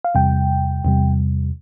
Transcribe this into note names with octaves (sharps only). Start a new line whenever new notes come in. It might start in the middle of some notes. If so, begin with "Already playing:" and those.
F5
E2 C3 G3 G5
E2 C3 G3